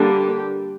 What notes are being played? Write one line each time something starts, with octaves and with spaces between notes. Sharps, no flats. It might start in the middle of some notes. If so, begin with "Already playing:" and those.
Already playing: D3 G3 A#3 D4
G4